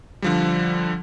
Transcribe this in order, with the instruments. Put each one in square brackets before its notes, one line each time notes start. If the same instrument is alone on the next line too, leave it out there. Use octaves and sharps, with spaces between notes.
[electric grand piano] D3 F3 G3